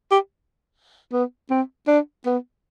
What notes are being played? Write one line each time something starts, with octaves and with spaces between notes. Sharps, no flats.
G4
B3
C4
D4
B3